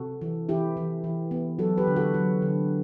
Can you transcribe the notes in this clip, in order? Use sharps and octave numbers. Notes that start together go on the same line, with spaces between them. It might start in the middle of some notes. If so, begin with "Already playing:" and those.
Already playing: C3 F#4 A4
E3
E3 E4 G4
E3
E3
B3
F#3 F#4 A4
G4 B4
D3
F#4 A4
F#3
D3